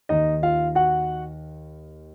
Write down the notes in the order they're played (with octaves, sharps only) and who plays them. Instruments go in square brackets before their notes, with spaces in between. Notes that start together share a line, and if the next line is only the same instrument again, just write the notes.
[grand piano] D#2 D#3 D#4 D#5
F4 F5
F#4 F#5